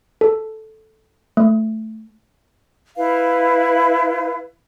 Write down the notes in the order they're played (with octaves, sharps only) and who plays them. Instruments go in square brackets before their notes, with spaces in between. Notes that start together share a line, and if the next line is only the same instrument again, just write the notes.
[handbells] A4
A3
[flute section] E4 B4 F5